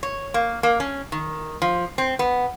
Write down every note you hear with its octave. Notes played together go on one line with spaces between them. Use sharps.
C#5
A#3
A#3
C#4
D#3
F3
C4
B3